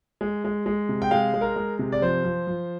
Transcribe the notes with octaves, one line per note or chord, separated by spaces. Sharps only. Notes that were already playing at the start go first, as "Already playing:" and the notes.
G#3
G#3
G#3
C3
G5
G#3 F5
G#3
A#4
G#3
C3
D5
F3 C5
F3
F3